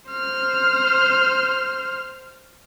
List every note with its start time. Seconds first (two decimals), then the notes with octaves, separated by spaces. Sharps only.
0.11 C5 F6